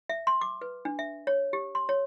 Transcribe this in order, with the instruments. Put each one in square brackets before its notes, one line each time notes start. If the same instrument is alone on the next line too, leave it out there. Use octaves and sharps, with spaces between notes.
[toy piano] E5
C6
D6
B4
D4
E5
C#5
G4
C6
C#5